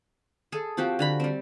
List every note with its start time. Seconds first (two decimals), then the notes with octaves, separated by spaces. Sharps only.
0.52 G#4 A4
0.77 F3 C4 F#4 G4
0.99 D3 A#5 B5
1.20 G3 C4